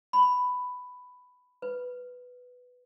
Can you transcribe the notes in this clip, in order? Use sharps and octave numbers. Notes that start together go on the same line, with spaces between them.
B5
B4